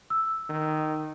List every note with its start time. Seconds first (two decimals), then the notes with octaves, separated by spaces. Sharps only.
0.10 E6
0.49 D#3